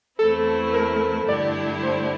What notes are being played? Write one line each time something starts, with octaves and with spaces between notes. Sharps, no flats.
E2 E3 A3 C4 E4 A4
A#4
G2 D3 A3 E4 G4 D5
C5